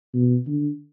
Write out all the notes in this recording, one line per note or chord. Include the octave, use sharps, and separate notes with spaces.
B2
D3